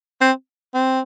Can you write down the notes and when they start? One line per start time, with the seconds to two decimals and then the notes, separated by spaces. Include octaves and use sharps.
0.21 C4
0.74 C4